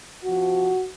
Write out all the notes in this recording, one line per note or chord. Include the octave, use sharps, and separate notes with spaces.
C3 F3 F#4